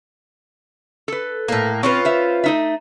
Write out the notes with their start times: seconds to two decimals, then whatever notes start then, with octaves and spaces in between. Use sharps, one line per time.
1.08 A4 B4
1.48 A2 A#3
1.83 C4 C#4 F4 B4
2.05 C5 E5
2.44 A3 D#4 E5